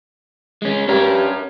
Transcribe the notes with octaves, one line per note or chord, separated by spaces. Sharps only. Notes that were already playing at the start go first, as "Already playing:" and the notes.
G#3 C#4
G2 C#4 A#4